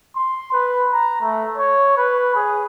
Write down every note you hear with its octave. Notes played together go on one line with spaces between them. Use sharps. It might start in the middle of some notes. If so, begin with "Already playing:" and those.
C6
B4
A#5
A3
C#5
B4
G#4